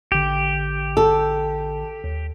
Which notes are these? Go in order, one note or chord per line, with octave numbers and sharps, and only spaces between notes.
A1 D3 G4
A4
D#2